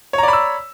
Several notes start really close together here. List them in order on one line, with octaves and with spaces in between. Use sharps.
C#5 A#5 D5 B5 E6